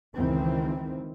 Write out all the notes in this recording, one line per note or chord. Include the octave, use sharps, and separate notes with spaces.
C#2 D#3 E3 C4